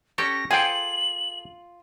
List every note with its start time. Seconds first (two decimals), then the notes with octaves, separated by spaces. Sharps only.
0.18 C#4 G4 A4 C#6 A#6
0.51 F4 G#4 A4 G5 G#5 F#7